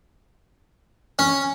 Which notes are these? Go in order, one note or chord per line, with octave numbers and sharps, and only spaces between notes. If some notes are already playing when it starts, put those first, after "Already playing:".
C#4